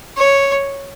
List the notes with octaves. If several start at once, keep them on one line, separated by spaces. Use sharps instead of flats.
C#5